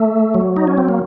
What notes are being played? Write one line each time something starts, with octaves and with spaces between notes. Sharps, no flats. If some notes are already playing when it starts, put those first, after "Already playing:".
Already playing: A3
F#3
D#4
C#4
C4
A#3